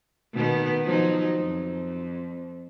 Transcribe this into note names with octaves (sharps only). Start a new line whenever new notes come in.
B2 D#3 B3
F3 F#3 D#4
F2